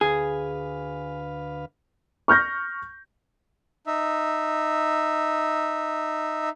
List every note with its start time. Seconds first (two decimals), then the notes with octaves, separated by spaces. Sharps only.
0.01 D2 G#4 B4 F5
2.28 C#6 F6 G6 A#6
3.87 D#4 E5